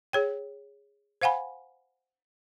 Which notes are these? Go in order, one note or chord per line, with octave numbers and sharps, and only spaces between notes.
G#4 C#5 G5
C5 F5 F#5 G#5 B5